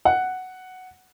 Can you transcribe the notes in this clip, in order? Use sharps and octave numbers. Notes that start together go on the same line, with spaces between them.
F#5